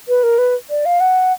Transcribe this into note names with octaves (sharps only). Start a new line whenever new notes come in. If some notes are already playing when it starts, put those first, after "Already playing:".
B4
A#4
B4
D5
F5
F#5